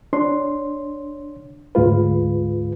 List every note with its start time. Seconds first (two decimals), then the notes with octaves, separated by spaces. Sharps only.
0.13 D4 C#5 C6
1.75 D2 G#2 G#3 F4 B4